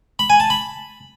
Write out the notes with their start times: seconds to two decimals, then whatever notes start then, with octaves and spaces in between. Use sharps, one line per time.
0.19 B5
0.30 G#5
0.40 A5
0.50 B5